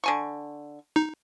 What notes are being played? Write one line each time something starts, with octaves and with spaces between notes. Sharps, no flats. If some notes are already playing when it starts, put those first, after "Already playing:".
D3 G#5 C#6
D#4